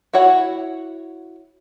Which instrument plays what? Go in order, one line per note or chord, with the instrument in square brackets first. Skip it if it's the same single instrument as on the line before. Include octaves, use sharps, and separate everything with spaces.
[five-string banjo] E4 F#4 C#5 F#5